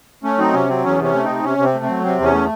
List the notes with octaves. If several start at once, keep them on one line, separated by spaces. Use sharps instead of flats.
A3 C#4
F#3 C4 D#4
C3 C#4
F#3 C4
E2 C#4
C3 C#4
A3
C4 D#4
C3
C3 C#4
C3
C4
A3
F#3 C4
C3 C4
E2
C#4
A3